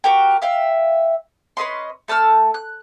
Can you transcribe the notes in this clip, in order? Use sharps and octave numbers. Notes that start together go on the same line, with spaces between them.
F#4 G4 A#4 G5
E5 F5 G5
C#4 B4 D#5 C6
A3 A5 E6 F6
F#6